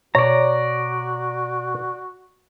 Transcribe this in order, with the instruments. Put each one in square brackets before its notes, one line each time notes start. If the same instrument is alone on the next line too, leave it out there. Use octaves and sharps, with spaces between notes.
[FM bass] B2 [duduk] F#4 [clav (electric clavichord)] C#5 [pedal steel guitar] D5 A#5